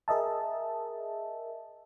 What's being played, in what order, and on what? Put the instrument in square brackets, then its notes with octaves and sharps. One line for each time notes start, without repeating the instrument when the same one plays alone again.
[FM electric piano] G#4 A#4 D#5 E5 A5